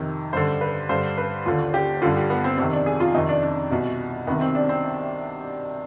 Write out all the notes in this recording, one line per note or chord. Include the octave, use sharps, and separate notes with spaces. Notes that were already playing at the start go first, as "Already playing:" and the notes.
Already playing: F2 C3 D#3
G2 D3 C5
B4
G2 D3 C5
B4
D#2 D3 F4
G4
G2 D3 F4
G4
B3
C4
F2 C3 D#3 C4
D4
G#4
F4
F2 C3 D#3 D#4
D4
D4
C2 B2
C2 C3 D#3 B3
C4
D4
C4